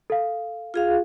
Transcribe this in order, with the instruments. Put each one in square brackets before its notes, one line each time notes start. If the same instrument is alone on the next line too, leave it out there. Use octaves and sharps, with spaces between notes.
[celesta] A4 F5
[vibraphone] F4 G#4 F5